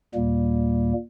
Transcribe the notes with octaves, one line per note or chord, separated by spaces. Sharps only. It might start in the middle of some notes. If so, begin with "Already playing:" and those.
D#2 A#2 G3 A#3